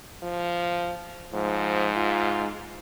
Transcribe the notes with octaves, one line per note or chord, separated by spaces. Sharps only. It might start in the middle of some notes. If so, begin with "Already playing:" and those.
F3
G#2 F3
F4